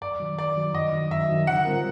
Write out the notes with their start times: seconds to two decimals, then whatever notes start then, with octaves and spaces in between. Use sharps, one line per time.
0.01 F#2 D5
0.20 D#3 F#3
0.39 F#2 D5
0.57 D#3 F#3
0.74 F#2 D#5
0.92 D#3 F#3
1.11 F#2 E5
1.29 D#3 F#3
1.47 D3 F#5
1.65 G3 C4 F4 A#4